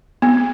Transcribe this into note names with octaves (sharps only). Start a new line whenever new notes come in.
B3